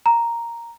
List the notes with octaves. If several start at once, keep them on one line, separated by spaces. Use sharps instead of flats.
A#5